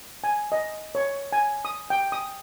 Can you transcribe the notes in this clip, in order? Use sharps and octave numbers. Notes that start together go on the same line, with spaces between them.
G#5
D#5
C#5
G#5
D#6
G5
D#6